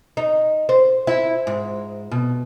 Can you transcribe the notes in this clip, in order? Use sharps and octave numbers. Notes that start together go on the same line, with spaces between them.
D#4
C5
E4
G#2
B2